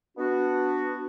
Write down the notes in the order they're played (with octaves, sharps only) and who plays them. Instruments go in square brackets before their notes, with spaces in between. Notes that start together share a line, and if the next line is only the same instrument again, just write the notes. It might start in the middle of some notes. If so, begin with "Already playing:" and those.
[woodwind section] B3 D4 F#4